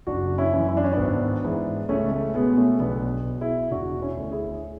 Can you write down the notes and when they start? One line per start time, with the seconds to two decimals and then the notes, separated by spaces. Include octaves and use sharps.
0.07 F#1 D4 F#4
0.38 C#4 E4
0.53 F#2 E3
0.68 E4
0.77 D4
0.84 C#4
0.92 B3 D4
0.98 G#1
1.44 G#2 E3
1.89 C#2 A3 C#4
2.12 A3
2.34 B2 G#3 B3
2.57 A3 C#4
2.80 B1 B3 D4
3.25 B2
3.40 E4 G#4
3.71 E1 D4 F#4
4.02 C#4 E4
4.17 D2 D3
4.31 E4 G#4